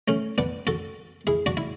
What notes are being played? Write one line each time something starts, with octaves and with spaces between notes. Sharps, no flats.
A3 C#4
B3 D4
F#4 A4
E4 G#4
D4 F#4
E4